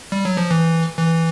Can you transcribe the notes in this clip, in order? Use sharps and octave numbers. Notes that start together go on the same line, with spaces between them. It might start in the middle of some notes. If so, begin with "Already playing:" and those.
G3
F#3
F3
E3
E3